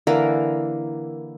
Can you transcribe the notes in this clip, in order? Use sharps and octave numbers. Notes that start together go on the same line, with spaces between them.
D3 E3 A#3 A#4